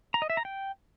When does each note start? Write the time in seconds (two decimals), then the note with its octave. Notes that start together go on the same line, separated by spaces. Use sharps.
0.14 A#5
0.22 D#5
0.30 E5
0.37 A#5
0.45 G5